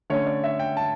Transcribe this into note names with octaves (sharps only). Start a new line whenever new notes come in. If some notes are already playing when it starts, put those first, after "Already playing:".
D3 A3 C#4 C#5
D5
E5
G5
A5